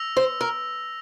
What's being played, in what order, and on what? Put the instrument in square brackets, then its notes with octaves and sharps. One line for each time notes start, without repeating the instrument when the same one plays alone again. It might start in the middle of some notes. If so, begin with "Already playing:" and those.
Already playing: [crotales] E6 A#6 F7
[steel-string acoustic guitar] C5
A#4